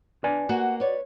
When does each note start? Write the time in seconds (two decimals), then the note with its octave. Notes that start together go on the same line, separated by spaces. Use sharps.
0.24 D4 B4 D5 G#5
0.49 A#3 F#4 F#5
0.80 B4 C#5 D5